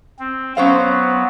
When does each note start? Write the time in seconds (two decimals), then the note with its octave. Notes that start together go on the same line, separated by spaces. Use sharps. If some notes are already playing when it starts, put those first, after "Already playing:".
0.19 C4
0.57 F#3 B3 C#4 C5 F5